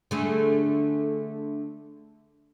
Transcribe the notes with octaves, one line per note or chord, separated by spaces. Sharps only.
D3 A3 G#4